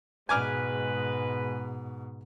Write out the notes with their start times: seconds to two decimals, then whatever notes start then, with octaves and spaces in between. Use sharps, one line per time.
0.29 G#2 B2 G#3 B4 G#5 D6 F6